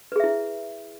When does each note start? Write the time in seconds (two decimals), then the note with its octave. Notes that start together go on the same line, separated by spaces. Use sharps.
0.12 B4
0.16 G#4
0.20 E5
0.24 E4